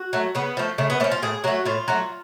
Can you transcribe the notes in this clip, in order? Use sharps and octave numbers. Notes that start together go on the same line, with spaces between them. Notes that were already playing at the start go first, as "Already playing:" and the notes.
Already playing: F#4
F#3 A3
C#3 B3
F3 A3
C#3 A3
B3
F3 A3 C#4
F4
A2 G#4
F#3 A3 F#4
A2 F4
F#3 A3